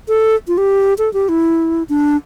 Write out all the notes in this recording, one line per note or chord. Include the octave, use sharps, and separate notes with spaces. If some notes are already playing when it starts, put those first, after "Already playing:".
A4
F4
G4
A4
G4
E4
D4